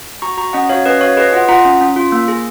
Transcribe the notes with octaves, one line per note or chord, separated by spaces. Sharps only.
F#4 A#5 C#6
F#4 A#5 C#6
C#4 D#5 F#5
F#4 C#5 F5
C#4 B4 D#5
F#4 C#5 F5
G#4 B4 D#5
F4 D#5 F#5
F4 F#5 A#5
C#4
C#4
F4
A#3
G#4